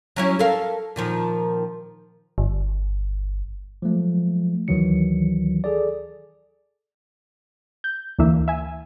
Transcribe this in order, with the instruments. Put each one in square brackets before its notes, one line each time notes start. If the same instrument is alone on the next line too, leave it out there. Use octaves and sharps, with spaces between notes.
[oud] F#3 C#4 E4
A4 A#4 F5
A#2 D#3 F3
[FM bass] G1
[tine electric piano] F3 F#3 G#3 A3
D2 D#3 E3 F#3 C#7
G#4 A4 D5
[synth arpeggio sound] G6
D2 E3 A#3 E5
E5 G#5